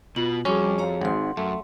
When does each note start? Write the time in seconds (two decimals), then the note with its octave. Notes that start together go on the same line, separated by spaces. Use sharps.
0.16 B2 F4 F#7
0.45 F2 G3 C#4 F#4 G#4 G5 D6
0.78 C#5 F5 A#5
1.01 G#1 G#2 F#5 C6
1.37 F#2 A3